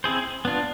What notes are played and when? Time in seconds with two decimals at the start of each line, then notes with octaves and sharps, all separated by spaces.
0.04 C4 E4 G#4 C5
0.45 B3 D4 F4